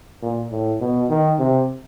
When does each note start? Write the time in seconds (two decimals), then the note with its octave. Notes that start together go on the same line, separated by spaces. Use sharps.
0.22 A#2
0.51 A2
0.80 B2
1.10 D#3
1.39 C3